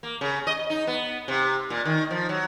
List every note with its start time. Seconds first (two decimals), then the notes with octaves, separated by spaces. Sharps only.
0.03 A#3
0.21 C#3
0.47 D#5
0.70 D#4
0.87 B3
1.28 C3
1.70 A#2
1.85 D#3
2.11 F3
2.29 F#3